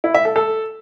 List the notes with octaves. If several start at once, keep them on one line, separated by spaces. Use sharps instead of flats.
E4
E5
A4
A4